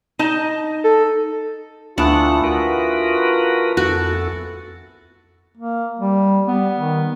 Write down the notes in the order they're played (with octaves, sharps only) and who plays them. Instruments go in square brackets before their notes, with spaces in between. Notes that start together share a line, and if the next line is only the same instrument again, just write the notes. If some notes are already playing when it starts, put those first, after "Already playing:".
[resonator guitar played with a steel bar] D#4 D#5 A5
[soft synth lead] A4
[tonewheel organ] D2 F#5 [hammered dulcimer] E3 A3 B3 [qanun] D4 [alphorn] F4
[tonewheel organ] F#4 A#4 B4
[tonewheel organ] F2 A4 [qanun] F#4
[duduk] A#3
G3
[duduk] G3 [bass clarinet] B3
[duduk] D#3